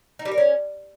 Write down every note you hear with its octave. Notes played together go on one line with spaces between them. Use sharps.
D#4
G3
A#4
C#4